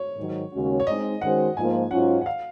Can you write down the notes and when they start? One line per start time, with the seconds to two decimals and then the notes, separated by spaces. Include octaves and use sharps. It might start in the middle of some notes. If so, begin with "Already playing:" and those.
Already playing: C#5
0.16 G#2 D#3 F#3
0.52 D#2 C#3 G#3 C#4 F#4
0.80 C#5
0.86 G#3 C4 D#4 D#5
1.21 D#3 G#3 C#4 F#4 C5 F#5
1.56 G#2 F3 A#3 F4 G#5
1.91 G#2 F#3 C#4 F4 F#5
2.21 F#5
2.26 F5